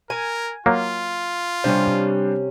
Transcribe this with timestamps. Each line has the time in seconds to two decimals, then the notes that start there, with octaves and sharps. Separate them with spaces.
0.10 A#4 G#5
0.66 F#3 A#3 F4
1.64 C3 G3 C#4 D4 C5